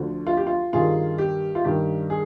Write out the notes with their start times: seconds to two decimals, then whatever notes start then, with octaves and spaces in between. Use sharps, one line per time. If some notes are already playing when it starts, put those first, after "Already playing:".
Already playing: D2 D3 F3
0.27 F4
0.37 G4
0.47 F4
0.73 G2 D#3 G3 F4 G#4
1.18 G4
1.55 F4
1.64 G2 D#3 G3 G4
2.10 G#4